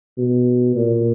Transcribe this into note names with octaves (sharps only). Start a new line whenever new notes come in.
B2
A#2